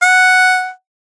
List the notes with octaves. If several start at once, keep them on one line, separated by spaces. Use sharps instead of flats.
F#5